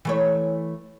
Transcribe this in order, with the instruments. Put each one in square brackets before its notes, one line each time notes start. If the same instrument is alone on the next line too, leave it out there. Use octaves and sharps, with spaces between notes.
[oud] E3 A3 C#5